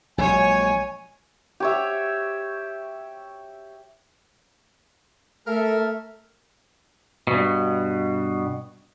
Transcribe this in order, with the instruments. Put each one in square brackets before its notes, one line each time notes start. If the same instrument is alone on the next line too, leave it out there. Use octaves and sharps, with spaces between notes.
[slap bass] A#1 F#3 G#3 [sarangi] C#5 [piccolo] G#5
[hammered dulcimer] G4 C#5 E5
[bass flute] A3 [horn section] A4 A#4 E5
[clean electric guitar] G2 B2